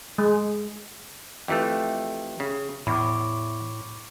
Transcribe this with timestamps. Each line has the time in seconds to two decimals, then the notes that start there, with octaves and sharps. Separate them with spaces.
0.18 G#3
1.48 F2 E3 A3 G4 E5 G5
2.40 C#3
2.87 E2 A2 B5 C#6 D6